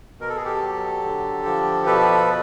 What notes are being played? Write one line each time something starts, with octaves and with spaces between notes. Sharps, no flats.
B2 A#4
A4
G#4
G4 A4
F#3
D3
F3
B2 A4 B4